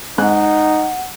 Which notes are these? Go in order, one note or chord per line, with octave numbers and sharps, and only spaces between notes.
G#2 D#4 F#5 F#6